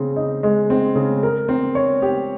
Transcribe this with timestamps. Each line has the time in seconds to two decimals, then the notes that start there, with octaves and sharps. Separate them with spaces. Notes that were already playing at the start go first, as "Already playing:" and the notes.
Already playing: C#3 C4
0.16 D#4
0.43 G#3
0.70 C4
0.95 C#3
1.23 A#4
1.49 C4
1.75 C#5
2.02 G4